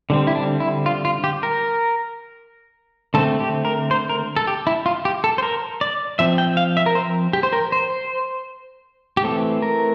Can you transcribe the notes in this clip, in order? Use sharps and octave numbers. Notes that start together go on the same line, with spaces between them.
D3 G3 C4
E4
D4
E4
F4
F4
G4
A#4
D3 A3 C4 A4
G4
A#4
C5
A#4
A4
G4
E4
F4
G4
A4
C5
A#4
D5
F3 C4 E5
G5
F5
E5
A#4
C5
G4
C5
A#4
C5
G4
E3 A3 C4 A4
A#4